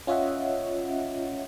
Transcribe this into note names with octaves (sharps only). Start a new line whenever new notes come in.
C#4 F4 C#5 D#5 E5 F#5